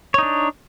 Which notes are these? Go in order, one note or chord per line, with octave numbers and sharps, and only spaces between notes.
D4 D#4 C#5